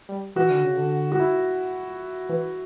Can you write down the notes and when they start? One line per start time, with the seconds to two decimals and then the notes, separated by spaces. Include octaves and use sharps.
0.09 G3
0.36 E3 F#4
0.50 D3
0.63 C#3
0.77 D3
1.12 F#4
1.20 E4
2.29 E3